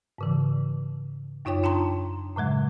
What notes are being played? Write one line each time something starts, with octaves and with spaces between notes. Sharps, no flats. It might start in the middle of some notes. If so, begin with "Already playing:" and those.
G#2 C#3 E3
F#2 D#4 F4 C#5 G5 D6
D4 F4 G5 A5 A#5 C6
A2 C#3 F#3 G#3